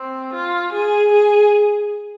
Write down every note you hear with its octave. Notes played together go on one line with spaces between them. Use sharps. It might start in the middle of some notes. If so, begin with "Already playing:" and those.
Already playing: C4
F4
G#4
G#4